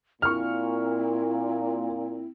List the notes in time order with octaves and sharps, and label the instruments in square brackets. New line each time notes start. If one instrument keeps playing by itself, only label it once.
[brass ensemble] A#2 [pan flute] C4 [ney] E4 [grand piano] C#6 F6